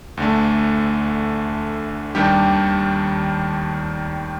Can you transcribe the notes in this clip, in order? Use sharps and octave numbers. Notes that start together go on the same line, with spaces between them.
D2 D3 A3
D#2 D#3 G3 D4 G4